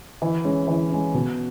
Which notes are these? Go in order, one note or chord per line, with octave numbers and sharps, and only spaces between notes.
E3
G#3 C#4
E3
G#3 C#4
B2